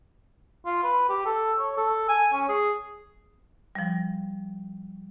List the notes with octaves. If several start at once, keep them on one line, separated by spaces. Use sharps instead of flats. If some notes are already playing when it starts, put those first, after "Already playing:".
F4
B4
G4
A4
C#5
A4
G#5
C#4
G#4
F3 G3